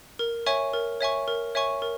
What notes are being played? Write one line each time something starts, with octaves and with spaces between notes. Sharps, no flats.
A#4
C#5 E5 G#5 C#6
A#4
C#5 E5 G#5 C#6
A#4
C#5 E5 G#5 C#6
A#4